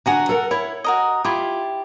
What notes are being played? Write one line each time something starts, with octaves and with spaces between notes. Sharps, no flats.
D3 F#4 C#5 F#5 G#5 A#5
A4 A#4 F#5
E4 C#5
F#4 A#4 D#5
E4 F4 G4